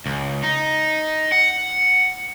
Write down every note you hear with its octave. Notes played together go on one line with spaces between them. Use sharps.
C#2
D#4
F#5